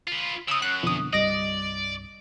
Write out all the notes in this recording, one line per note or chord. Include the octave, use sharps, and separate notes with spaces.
F4 B4
C#3 D#6 E6
F#2 F#6
F2 B2 D3 D#6
C2 G2 G3 D5 D#5 A#6